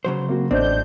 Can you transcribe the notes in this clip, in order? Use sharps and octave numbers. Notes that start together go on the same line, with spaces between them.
C#3 F#3 C5
A#3 C4 F#4
A1 C4 D4 C5 D#5 G6